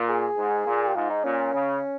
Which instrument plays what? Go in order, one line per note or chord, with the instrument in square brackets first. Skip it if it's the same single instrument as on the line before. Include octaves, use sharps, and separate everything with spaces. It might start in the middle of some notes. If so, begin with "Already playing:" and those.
Already playing: [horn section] A#2
[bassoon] G#4
[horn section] G#2
A#2
[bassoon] G4
[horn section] G#2 [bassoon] F4
[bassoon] D#4
[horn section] A#2 [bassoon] C#4
[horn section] C#3